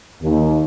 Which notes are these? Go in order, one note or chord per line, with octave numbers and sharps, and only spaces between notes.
D#2